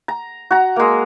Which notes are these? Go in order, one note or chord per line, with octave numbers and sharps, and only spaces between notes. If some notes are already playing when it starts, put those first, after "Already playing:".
A#5
F#4 A#5
G#3 A#3